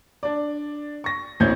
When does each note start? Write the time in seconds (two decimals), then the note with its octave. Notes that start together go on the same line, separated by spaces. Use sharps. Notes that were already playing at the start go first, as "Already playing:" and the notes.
0.23 D4 D5
1.04 C#6 A#6
1.40 A1 D2 C4 C#4 G6 G#6